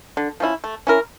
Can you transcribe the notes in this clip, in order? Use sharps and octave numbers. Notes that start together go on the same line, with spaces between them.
D3
F3 C#4 E4
A3
C#4 E4 A#4